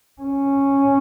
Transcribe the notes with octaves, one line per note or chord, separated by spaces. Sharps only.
C#4